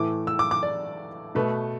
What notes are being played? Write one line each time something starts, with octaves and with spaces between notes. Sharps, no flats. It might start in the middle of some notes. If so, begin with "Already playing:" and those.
Already playing: A2 E3 A3 D6
E6
D6
D6
D5
B2 A3 B4